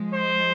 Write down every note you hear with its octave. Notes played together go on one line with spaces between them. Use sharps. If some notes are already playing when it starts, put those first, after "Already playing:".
Already playing: F3 G#3
C5